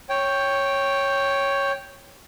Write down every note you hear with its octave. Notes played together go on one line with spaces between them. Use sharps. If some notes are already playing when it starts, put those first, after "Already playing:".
C#5 G5